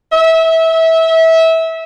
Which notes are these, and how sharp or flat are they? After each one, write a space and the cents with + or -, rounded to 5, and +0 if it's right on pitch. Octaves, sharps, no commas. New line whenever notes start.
E5 -20